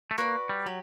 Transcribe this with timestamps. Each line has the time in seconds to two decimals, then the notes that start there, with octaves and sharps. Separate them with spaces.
0.11 A3
0.18 A#3 F#4 B4 D5
0.49 G3
0.66 F#3 G4